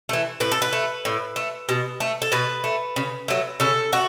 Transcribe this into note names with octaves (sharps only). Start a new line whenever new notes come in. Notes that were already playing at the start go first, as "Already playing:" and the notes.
E3 A3
A2 B4
A4
B4
A3
A2
A3
B2
A3
A4
B2 B4
A3
C#3
F#3 A3
C#3 A4
A3 F#4